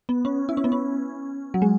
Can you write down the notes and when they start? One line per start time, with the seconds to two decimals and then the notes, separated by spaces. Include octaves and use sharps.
0.09 B3
0.25 C#4
0.49 E4
0.57 C#4
0.64 B3
0.72 C#4
1.54 F#3
1.62 G#3